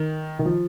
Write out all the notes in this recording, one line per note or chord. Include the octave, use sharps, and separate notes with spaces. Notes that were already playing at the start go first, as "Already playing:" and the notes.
Already playing: D#3
D#3
F3